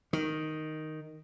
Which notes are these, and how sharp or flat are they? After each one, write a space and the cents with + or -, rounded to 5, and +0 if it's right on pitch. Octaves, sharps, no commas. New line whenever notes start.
D#3 +0